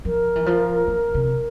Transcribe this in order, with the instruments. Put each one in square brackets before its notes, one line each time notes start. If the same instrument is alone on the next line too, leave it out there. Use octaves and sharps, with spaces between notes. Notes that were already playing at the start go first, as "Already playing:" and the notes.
[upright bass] F3 [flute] A#4
[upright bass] E3
F3
E3
C3